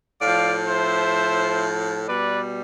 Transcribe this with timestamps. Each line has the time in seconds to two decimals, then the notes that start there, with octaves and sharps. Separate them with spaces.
0.22 A2 F3 D5 F5
0.69 C5 E5
2.08 B2 G3 B4 D5